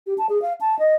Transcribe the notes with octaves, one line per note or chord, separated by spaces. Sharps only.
G4
A5
G#4
F5
A5
D#5